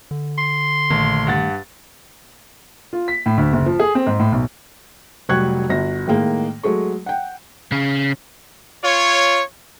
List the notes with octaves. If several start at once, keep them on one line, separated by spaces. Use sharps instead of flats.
D3
C6
A#1 D#3 A3
G2 F#5 A6
F4
B6
A2
D2
F#1
F3
G#4
C4
G#2
A2
B1
F1 F#3 G3 C#6 F#6 G#6
G1 F#4 A#6
A2 D#3 G#3 A#3
F#3 G#3 A3 C#6
F#5 G5
C#3
F4 C#5